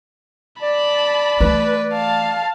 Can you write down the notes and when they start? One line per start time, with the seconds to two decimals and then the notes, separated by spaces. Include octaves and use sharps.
0.62 D5 A5 B5
1.41 E3 A3 B4
1.94 F5 A5